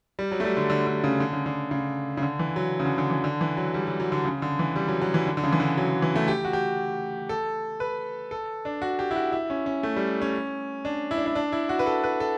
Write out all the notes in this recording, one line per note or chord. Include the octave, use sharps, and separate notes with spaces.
G3
F#3
A3
G3
D3
D3
D3
C#3
D3
C#3
D3
C#3
C#3
D3
E3
F#3
C#3
D3
D3
E3
D3
E3
F#3
G3
F#3
F#3
D3
C#3
D3
E3
G3
F#3
F#3
E3
D3
D3
C#3
E3
D3
F#3
D3
E3
A3
G4
F#4
G4
A4
B4
A4
D4
F#4
G4
E4
F#4
E4
C#4
C#4
A3
G3
C#4
D4
E4
D4
E4
D4
E4
F#4
B4
A4
B4
A4